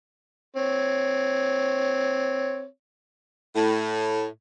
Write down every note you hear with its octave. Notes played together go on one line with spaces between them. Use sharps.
C4 C#5
A2